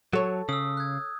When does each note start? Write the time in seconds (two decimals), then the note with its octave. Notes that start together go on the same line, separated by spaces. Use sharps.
0.13 F#3 A4 C#5
0.49 C#3 D#6 E6
0.77 F#6 G#6